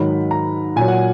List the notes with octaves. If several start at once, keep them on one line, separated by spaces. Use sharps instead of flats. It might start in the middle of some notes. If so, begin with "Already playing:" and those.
Already playing: G#2 D#3 F#3 B5
A#5
A#2 F#3 G#5
F#5